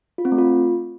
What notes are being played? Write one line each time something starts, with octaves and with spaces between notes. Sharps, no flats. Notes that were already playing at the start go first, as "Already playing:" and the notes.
F4
C4
A3
F4